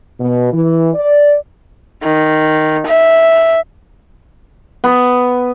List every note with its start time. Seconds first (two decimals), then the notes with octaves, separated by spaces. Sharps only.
0.19 B2
0.52 E3
0.94 D5
2.03 D#3
2.87 E5
4.84 B3